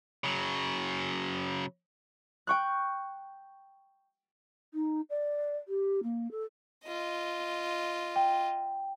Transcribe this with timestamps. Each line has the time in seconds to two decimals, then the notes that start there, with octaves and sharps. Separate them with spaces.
0.24 C#3 F#3
2.47 G5 C#6 F#6
4.74 D#4
5.10 D5
5.68 G4
6.03 A#3
6.31 A4
6.85 F4 D#5
8.16 G5